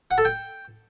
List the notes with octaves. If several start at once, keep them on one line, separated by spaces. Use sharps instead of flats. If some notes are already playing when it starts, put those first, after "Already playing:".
F#5
A4
G5